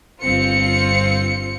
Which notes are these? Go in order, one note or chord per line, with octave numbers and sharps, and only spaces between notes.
G1 C4 F4 C#7